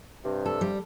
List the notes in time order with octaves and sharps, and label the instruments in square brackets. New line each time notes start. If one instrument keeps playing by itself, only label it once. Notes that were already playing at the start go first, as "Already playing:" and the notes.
[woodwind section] G2 C3
[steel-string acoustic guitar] A4
G3